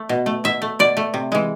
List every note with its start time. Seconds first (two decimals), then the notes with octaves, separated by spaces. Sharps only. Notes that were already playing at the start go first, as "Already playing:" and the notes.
Already playing: A3
0.09 B2
0.26 A3
0.44 B2 E5
0.62 A3
0.79 B2 D5
0.97 A3
1.14 C3
1.32 E3 G#3